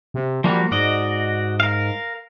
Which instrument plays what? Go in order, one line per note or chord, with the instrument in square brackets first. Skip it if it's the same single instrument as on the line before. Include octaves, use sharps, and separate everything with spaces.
[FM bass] C3
[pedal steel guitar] F3 A#3 F#4 [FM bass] G3
[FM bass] G#2 [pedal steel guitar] F#4 D5 D#5
[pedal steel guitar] A#4 F5